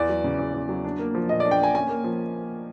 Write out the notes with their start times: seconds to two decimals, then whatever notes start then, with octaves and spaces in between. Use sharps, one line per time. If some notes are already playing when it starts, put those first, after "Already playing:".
Already playing: E2 B3 D5
0.09 F#3
0.24 C#3
0.39 E2
0.54 E2
0.69 F#3
0.84 D4
0.99 A#3
1.15 F3
1.29 A#2 D#5
1.40 D4 D5
1.51 G5
1.60 A#3 G#5
1.74 C#4 G#5
1.89 A#3
2.04 F3